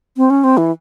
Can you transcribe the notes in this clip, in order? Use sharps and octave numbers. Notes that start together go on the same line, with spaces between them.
C4
C#4
C4
E3